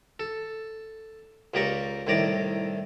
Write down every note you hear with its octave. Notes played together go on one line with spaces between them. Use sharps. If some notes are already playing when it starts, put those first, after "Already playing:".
A4
C#2 A#3 G4 D5 A#5 C#6
C2 A2 D#3 D5 A#5 D6